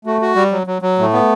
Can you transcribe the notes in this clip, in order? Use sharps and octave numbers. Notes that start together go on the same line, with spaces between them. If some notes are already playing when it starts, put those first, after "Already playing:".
A3 F#4
F#4
G3
F#3
F#3
F#3
A2 A3
B3